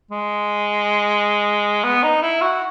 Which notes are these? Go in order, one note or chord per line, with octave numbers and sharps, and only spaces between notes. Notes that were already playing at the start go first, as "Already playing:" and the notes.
G#3
B3
D#4
E4
F#4